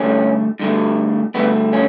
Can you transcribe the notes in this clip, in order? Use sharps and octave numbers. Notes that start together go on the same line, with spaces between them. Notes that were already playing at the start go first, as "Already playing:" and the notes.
Already playing: G2 D3 A3 C#4
G2 D3 A3
G2 D3 A3 B3
C#4